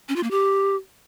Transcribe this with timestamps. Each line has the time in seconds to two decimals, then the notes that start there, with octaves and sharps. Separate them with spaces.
0.09 C#4
0.16 F4
0.23 A#3
0.31 G4